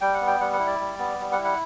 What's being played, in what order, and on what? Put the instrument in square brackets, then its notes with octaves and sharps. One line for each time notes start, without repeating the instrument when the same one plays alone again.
[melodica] G3 G5
F#5
B3
G5
G3 F#5
F#5
E4
D5
G3
B3
G3
F#5
E4
F#5